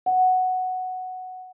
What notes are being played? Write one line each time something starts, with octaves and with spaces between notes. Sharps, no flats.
F#5